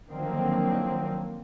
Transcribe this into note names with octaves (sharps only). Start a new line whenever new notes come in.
D3 D#3 F3 F#3 A#3 C4